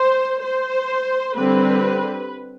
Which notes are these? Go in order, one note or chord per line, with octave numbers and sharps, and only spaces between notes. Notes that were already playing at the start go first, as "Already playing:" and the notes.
Already playing: C5
C5
D3 G3 C4 B4